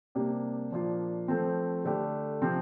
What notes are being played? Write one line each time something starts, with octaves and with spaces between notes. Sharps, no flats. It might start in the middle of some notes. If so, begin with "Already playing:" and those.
C3 G3 A#3 D4 G4
A#2 F3 A#3 D4 F4
F3 A3 C4
D3 A3 D4 G4
C3 F3 C4